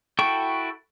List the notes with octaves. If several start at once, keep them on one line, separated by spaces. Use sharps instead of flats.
E4 F#4 A4 G5 C#6